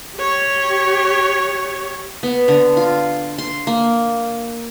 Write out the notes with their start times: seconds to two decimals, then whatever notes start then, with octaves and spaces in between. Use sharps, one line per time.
0.18 G4 C#5
2.23 B3
2.48 D3
2.77 F4
3.38 C6
3.67 A#3